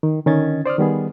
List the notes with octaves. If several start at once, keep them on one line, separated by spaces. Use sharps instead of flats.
D#3
D3 D#3 C#4 D#5 G#6 A6
C5 D5 D#6 F6
D#3 G3 B3 G#4